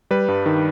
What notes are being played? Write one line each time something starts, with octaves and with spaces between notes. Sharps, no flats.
G3 B4
G2
D#3